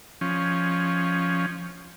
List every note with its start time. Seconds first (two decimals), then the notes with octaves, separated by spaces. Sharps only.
0.21 F3 C#4